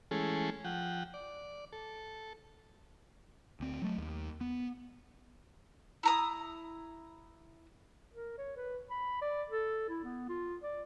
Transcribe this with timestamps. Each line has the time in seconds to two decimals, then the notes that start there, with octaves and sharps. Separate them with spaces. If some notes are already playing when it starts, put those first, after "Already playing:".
0.11 E3 G#3 A3 C#4 G#4 A4
0.65 F3 F#5 G5
1.14 D5
1.73 A4
3.60 D2 C4
3.82 F#3 A3
3.98 D#2
4.41 B3
6.03 E4 A#5 D#6
8.13 A#4
8.38 C#5
8.57 B4
8.90 B5
9.22 D5
9.50 A4
9.89 E4
10.04 B3
10.29 F4
10.63 D5